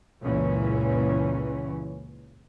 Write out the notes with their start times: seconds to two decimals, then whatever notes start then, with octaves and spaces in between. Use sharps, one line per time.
0.23 F#1 C#2 A#2 E3 G#3 C#4